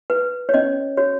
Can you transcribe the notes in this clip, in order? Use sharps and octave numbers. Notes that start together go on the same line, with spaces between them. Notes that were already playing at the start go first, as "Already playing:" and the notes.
B4
C#5
C#4 D#5
F#4 C#5